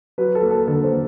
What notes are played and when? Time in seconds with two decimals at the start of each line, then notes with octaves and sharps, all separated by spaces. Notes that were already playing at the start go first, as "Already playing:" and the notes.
0.18 F#3 B4
0.35 A4
0.42 A#3
0.51 A4
0.67 D3 A4
0.84 C5
0.92 A#3